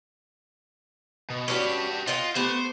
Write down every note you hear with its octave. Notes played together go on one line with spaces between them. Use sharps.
B2
C#4 D4 F#4 G4 B4
F4 D#5 F#5 G5
A3 B3 G4 C5